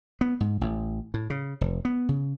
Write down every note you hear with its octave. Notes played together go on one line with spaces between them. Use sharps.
B3
G#2
A1
A2
C#3
F1
B3
C#3